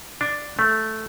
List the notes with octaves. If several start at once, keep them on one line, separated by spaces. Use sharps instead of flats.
D4
A3